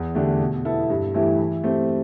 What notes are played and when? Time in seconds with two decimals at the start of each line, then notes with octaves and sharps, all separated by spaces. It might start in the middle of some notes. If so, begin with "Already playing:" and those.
Already playing: E2
0.15 D3 A3 D4 G4
0.40 B2
0.65 B3 E4 A4
0.90 G2
1.14 E3 A3 E4 G4
1.39 E3
1.64 A3 C4 G4